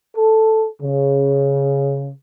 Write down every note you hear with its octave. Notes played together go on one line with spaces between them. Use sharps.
A4
C#3